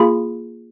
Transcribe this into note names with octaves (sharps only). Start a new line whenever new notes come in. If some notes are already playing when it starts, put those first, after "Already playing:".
Already playing: A#3 F4 G#4 B5